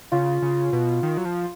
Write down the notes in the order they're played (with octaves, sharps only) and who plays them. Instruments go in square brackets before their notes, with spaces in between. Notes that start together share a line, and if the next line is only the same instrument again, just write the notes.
[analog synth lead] C#3 [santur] F4
[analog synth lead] C#3
B2
D#3
F#3
F3